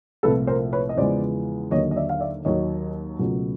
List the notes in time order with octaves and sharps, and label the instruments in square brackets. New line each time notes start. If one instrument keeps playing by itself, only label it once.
[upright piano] C2 A#2 F3 A3 A4 B4
A#4 C5
B4 C#5
D#5
E2 C#3 F3 G#3 B3 C5 D5
D#2 D3 F#3 A#3 C#5 D#5
D#5
D5 E5
F5
D5 E5
D#2 D#3 F#3 C#5 D#5
C#2 B2 F#3 A3